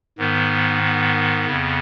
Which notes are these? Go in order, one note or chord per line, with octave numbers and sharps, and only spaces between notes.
G#2 D#3 B3
B3
F2 C#3